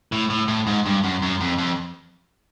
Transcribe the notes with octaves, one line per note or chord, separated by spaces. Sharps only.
A2
A2
A2
G#2
G2
F#2
F#2
F2
F2